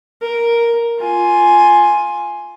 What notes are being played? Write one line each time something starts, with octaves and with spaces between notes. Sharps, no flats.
A#4
F4 G#5